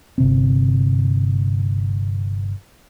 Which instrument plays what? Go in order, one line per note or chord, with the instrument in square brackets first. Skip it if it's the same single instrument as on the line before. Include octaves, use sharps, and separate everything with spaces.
[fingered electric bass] G1 C3 C4